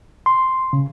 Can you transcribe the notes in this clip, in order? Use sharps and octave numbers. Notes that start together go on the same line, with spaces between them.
C6
C#3